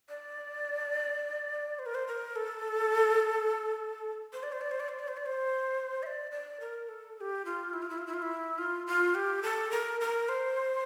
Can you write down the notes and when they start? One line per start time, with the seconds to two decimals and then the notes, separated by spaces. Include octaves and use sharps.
0.09 D5
1.79 C5
1.86 A#4
1.95 C5
2.07 A#4
2.36 A4
4.33 C5
4.43 D5
4.52 C5
4.61 D5
4.71 C5
4.80 D5
4.89 C5
4.99 D5
5.08 C5
5.17 D5
5.26 C5
6.03 E5
6.07 D5
6.31 D5
6.60 A#4
6.89 A4
7.16 A4
7.21 G4
7.45 F4
7.73 E4
7.82 F4
7.90 E4
7.98 F4
8.07 E4
8.14 F4
8.22 E4
8.58 F4
8.87 F4
9.15 G4
9.43 A4
9.71 A#4
10.01 A#4
10.29 C5